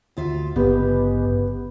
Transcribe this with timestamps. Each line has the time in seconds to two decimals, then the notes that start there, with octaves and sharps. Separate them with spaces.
0.17 D2 F4 E5
0.56 G#1 G2 C#3 B3 G4